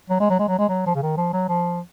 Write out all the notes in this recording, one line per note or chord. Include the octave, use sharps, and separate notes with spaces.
F#3
G#3
F#3
G#3
F#3
G#3
F#3
F3
C#3
D#3
F3
F#3
F3